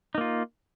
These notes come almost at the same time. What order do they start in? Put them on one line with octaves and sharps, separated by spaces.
D#4 A#3 F4